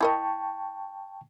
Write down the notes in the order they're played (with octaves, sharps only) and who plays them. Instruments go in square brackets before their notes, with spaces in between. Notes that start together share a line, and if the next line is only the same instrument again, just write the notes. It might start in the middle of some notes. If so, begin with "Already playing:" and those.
[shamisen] E4 A#4 D#5 [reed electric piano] G5 A5 C#6